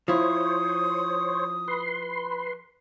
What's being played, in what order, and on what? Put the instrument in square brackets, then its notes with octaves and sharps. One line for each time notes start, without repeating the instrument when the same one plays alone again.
[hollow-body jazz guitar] F3 E4 [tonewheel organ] C5 C#5 [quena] D#6
[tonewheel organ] B4 C6